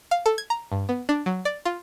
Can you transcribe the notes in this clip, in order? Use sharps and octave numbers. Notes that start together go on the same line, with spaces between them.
F5
A4
G#6
A#5
G2
B3
D4
F#3
D5
F4